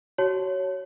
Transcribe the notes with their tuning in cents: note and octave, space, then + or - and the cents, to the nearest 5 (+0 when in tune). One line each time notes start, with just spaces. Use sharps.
F#4 +30 C#5 +0 A5 +0